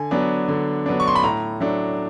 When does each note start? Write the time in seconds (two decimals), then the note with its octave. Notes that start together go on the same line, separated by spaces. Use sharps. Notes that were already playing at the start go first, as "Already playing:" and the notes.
Already playing: D3 G#5
0.11 F#3 B3 D4
0.48 D3
0.86 F#3 B3 D4
1.00 C#6
1.07 C6
1.15 B5
1.23 A2 A#5
1.60 F#3 A3 D4